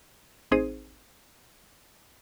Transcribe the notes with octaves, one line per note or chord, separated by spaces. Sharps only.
A1 C4 D#4 G#4 C5 D#7